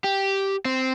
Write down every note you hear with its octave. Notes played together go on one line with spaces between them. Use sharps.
G4
C4